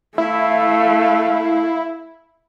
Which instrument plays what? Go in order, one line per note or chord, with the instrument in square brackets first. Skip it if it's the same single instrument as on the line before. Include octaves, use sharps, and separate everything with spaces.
[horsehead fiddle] A3 F5 [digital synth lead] E4